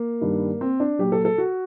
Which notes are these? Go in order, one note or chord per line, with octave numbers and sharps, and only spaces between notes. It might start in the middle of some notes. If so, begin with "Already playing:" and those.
Already playing: A#3
G2 D#3 G3
C4
D4
A#2 F#3 G4
A4
A4
F#4